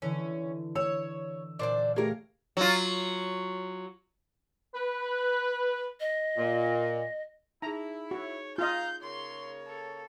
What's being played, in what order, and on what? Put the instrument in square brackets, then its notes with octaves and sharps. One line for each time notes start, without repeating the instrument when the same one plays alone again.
[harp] D3 E3 [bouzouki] C#4
[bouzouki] C#5 [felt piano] E6
[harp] A#2 [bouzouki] D4 C5 D5
[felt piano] A3 G4 G#4 [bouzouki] A#3 A#4 [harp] C#5 F5 A#5
[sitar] F#3 F4
[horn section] B4
[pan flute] D#5
[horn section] A#2
[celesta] D#4 G#4 [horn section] E4 [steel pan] A#5
[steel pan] F#4 [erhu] C#5
[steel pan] F4 D#5 [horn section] F5 A#5 [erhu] G6
[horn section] C#3 A#3 C#5 [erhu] C6
[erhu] A4